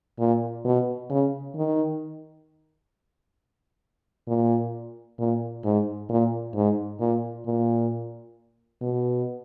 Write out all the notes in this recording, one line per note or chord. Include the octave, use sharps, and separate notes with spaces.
A#2
B2
C#3
D#3
A#2
A#2
G#2
A#2
G#2
A#2
A#2
B2